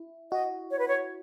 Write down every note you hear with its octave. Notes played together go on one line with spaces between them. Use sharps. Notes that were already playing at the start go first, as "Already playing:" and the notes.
Already playing: E4
F#4 D#5
C#5
B4
C#5